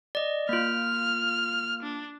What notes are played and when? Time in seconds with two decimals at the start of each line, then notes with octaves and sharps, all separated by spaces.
0.15 D5 D#5
0.49 A#3 F4 F6
1.83 D4